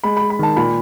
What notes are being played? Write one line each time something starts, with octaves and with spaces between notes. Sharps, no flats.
G#3 B5
G#3 B5
B5
D#3 A5
A#2 B5